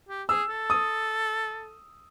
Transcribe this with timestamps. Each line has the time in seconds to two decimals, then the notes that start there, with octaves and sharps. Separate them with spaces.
0.09 G4
0.29 G#4 E6
0.49 A4
0.70 D#6